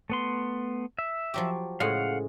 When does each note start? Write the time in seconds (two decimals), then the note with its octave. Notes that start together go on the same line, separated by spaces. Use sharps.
0.10 A3 B3 C6
0.99 E5
1.34 F3 F#3 G4
1.80 A2 C#3 G#3 F5 F#5